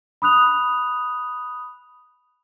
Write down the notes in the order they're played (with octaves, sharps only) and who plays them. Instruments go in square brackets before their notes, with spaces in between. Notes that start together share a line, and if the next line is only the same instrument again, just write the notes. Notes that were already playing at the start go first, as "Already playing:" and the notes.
[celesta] B5 D#6 F#6 F7